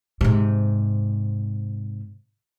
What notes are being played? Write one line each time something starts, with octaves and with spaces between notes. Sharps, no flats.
G#2 C3